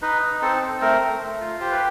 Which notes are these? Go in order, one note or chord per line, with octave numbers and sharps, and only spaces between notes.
D#4 B4
D#4
C4 A4
C4
A3 A#4
A3
A3
F4
G4 C5
B4